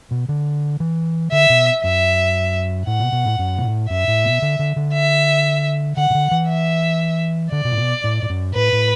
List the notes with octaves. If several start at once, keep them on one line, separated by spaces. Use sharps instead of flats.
B2
D3
E3
D3 E5
B2
F#2 E5
A2 F#5
B2
B2
A2
F#2
B2
A2
F#2 E5
A2
B2
D3
D3
D3
E5
D3 F#5
B2
D3
E3
E5
D3 D5
B2
A2
B2
A2
A2
F#2
A2 B4
A2